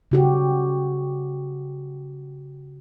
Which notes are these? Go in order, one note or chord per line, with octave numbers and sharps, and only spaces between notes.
C#3 F#4 G4